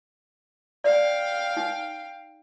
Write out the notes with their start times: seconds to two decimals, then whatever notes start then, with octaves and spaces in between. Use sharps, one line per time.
0.84 D5 F5 G5
1.57 D#4